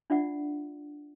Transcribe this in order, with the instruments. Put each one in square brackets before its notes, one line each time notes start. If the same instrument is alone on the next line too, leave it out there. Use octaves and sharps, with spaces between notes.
[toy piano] D4 F4 D5 E5 F#5